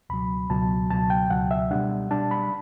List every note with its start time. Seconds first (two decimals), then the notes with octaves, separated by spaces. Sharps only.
0.10 C#2 B2 F#3 B5
0.50 C#2 B2 F#3 A5
0.90 C#2 B2 F#3 A5
1.10 G5
1.30 C#2 B2 F#3 F#5
1.51 E5
1.71 B2 G3 D4 F#5
2.11 B2 G3 D4 A5
2.31 B5